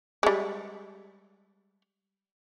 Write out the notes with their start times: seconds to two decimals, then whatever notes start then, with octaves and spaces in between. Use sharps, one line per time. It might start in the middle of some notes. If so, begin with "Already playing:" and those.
0.23 G3 G#3